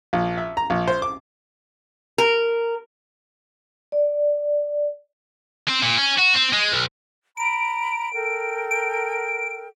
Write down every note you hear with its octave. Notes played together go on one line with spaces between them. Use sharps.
A#1
E5
A#5
A#1
C5
D6
A#4
D5
C4
A#2
C#4
F#4
C4
G#3
B1
A#5 B5 D7
A4 A#4 G5
D7